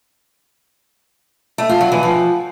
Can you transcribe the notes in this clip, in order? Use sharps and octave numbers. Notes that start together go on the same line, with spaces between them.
A3
F4
F#3
E3
F3